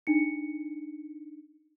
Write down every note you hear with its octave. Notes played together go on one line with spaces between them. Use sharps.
D4 D#4 C#7